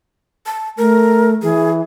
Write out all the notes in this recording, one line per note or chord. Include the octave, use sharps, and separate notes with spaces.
A5
A3 A#4
E3 G#4